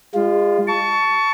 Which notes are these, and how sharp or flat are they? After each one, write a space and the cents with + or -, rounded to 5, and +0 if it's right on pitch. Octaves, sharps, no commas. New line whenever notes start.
G#3 -35 F4 +0
A5 +0 C#6 +20